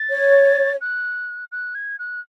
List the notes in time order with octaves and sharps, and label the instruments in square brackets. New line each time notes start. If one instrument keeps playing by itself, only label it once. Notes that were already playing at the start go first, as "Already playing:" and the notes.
Already playing: [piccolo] A6
[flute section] C#5
[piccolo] F#6
F#6
G#6
F#6